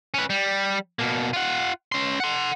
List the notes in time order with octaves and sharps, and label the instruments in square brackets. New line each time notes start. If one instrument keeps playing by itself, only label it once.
[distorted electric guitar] C#4 B4
G3
B2 A#3
F4 F#5
C#4 C6
F#5 C6